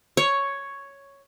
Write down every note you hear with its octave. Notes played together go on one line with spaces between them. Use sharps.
C#5